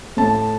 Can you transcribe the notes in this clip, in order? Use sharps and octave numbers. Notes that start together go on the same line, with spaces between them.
A2 A5